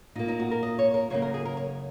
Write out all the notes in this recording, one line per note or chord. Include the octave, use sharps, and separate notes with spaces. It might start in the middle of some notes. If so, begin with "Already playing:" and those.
A#2 A#3 D#4
D#4
F#4
A#4
D#5
C#5
A#4
F#2 C#3 A#3 C#5
A#4
G#4
A#4
C#5